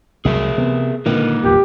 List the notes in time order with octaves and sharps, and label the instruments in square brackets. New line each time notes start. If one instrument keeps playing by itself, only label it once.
[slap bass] C2 F#3 [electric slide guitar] G#4 A#4 E5
[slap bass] C3 [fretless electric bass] B3
[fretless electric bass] A#2 D3 [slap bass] D#3 [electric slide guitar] A#3 A#4 B4
[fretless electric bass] E1 B1 A#2 [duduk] G4